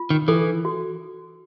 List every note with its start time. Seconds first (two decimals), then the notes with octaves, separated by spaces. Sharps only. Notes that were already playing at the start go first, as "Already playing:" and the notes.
Already playing: F4
0.10 D#3
0.28 E3 A4
0.65 F#4